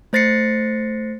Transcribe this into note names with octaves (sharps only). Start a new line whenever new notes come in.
A3 C5 A6 A#6 C7 C#7